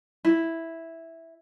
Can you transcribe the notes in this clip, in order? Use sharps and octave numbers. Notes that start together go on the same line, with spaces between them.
E4